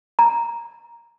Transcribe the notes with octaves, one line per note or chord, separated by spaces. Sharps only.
A#5